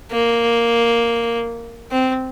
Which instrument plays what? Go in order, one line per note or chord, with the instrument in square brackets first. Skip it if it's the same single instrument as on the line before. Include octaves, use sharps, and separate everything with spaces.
[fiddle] A#3
C4